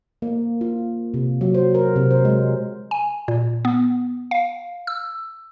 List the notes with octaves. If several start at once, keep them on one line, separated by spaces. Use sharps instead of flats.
A#3
F4
C3
F#3
C5
A#4
C3
C5
G#3
G#5
A#2
B3
F5
E6